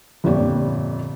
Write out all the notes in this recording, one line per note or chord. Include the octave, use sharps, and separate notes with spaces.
G1 F2 A#2 G4 C#5 D5